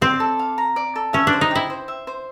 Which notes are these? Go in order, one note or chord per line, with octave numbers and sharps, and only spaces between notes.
C4 D5
A4
F5
A#5
D5
A4
C#4 E5
D4
C5
D#4
E4 G5
C5
E5
C5